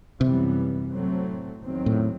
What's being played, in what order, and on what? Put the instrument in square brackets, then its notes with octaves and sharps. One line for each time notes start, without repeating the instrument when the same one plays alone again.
[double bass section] F#2 E3 G3 B3 [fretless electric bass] C3
[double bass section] A2 F#3 A3 C4
E2 D#3 F#3 C4
[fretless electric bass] A2